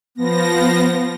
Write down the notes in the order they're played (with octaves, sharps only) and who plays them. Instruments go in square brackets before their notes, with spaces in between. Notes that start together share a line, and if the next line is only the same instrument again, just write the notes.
[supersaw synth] F3 A#6 [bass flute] B3